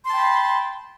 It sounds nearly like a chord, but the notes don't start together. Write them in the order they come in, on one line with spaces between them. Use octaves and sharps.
C6 A5 G5 B5